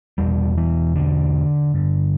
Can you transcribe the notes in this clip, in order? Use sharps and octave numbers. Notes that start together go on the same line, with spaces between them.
E2 B2 G3
E3
D3
G2 D3